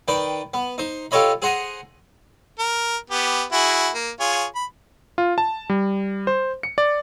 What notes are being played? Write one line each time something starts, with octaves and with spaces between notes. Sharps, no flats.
D#3 B4 D5 G5
B3
D#4 C5
F4 G4 A4 C#5 D#5 B5
G#4 C5 F#5 A#5 D#6
A#4
B3 G4
E4 F#4 G#4
A#3
F4 G#4 C#5
B5
F4
A5
G3
C5
C#7
D5